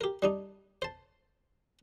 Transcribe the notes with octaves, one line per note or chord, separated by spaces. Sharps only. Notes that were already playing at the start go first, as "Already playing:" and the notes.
G4 A#4
G3 D4 D#4
C5 A5